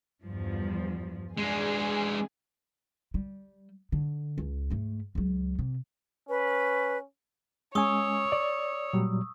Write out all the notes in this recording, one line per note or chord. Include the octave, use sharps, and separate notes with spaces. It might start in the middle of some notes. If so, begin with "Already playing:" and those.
E2 G2 F3
G#3 D4 G#4
G3
D3
C#2
G#2 A3
C#2 F#3
C3
C#4 B4
G#3 C#4 C#5 G#5 C#6 D#6 E6
D5
A#2 F#3 G3